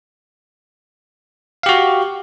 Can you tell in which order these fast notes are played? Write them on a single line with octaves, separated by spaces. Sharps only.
F5 G4 F#4